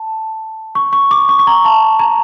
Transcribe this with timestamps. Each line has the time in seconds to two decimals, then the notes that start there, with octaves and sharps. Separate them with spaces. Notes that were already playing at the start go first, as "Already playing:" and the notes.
Already playing: A5
0.75 C#6
0.93 C#6
1.11 D6
1.29 C#6
1.39 C#6
1.47 A#5
1.65 A5
1.99 A#5